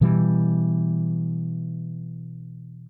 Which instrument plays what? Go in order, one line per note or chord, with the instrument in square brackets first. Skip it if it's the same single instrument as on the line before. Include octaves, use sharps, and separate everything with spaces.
[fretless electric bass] B2 E3 G3